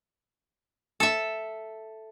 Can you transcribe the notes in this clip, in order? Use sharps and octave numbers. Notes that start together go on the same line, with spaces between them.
A4 E5